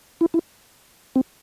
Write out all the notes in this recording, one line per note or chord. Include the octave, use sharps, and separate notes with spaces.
E4
E4
C4